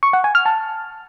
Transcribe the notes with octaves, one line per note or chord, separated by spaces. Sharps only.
C#6
F#5
G#5
F6
A5